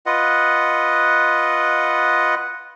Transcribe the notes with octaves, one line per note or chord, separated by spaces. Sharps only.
F4 B4 D#5 F#5